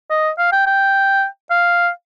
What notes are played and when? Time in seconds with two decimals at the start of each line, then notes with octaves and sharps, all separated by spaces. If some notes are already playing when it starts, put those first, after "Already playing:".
0.10 D#5
0.38 F5
0.52 G5
0.67 G5
1.51 F5